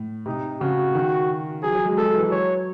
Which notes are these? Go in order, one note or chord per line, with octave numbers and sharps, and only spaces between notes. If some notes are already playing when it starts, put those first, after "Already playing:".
Already playing: A2
C3 D#4
C#3 F#4
D#3
F#3 G#4
F#3
G#3
G#3 A4
F#3
E3
F#3
C#5